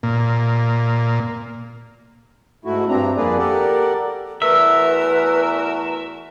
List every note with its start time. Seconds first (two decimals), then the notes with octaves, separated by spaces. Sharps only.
0.03 A#2
2.65 G#2 A3 E4 F#4
2.88 G2 C4 D4 A#5
3.17 F2 A#3 D4 G#4 B4 D5
3.38 G4 A4 A#4 D5 F#5
4.42 E2 A3 F#4 A#4 B4 E5